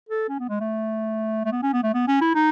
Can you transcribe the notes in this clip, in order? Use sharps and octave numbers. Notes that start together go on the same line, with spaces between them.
A4
C#4
B3
G#3
A3
A3
B3
C#4
B3
A3
B3
C#4
E4
D#4